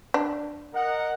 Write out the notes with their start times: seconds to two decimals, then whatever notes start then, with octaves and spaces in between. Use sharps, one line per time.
0.14 D4
0.74 A#4 D#5 F#5